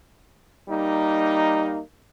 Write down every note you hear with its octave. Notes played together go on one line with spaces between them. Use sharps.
G3 A#3 D#4